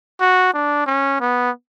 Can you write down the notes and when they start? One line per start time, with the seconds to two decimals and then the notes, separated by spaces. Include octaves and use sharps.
0.20 F#4
0.54 D4
0.87 C#4
1.21 B3